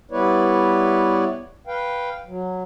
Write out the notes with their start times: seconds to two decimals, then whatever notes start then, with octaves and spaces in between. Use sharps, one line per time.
0.11 G3 B3 E4 B4 C#5 D5
1.67 B4 F5 G5
2.26 F#3